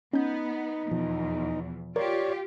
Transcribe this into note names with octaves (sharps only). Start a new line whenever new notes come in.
B3 C#4 D#4 G6
E2 B2 F3
F4 G4 A#4 C#5 D5